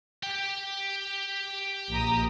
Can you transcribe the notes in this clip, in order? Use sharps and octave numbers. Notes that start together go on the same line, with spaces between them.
G4 G5
A#1 A#5 D#6